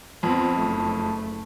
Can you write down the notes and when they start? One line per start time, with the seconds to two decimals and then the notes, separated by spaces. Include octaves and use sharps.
0.23 F2 B3 C4
0.58 F#1 A3